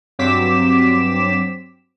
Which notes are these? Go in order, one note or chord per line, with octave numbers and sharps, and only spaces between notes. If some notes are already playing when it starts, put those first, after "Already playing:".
G2 F#3 C4 D6 B6 E7